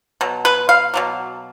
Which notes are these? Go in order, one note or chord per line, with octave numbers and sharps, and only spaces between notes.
B2 F#3
B4
F5
B2 F#3 A#3